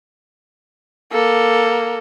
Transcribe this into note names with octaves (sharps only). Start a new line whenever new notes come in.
A#3 A4